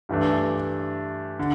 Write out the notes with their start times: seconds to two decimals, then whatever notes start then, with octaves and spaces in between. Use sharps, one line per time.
0.09 G2 E3 A3 D4
1.39 D3